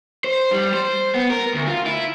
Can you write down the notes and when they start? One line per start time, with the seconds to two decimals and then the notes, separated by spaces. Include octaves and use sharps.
0.24 C5
0.52 G3
0.74 C5
1.15 B3
1.30 A#4
1.55 D2
1.67 F4
1.87 E4